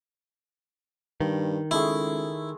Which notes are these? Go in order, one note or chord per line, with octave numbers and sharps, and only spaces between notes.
G2 D#3
C#2 G#3 A3 E4 G#4